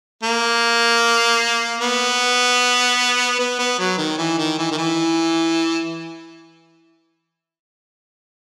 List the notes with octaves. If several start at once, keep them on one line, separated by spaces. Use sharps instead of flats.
A#3
B3
B3
B3
F#3
D#3
E3
D#3
E3
D#3
E3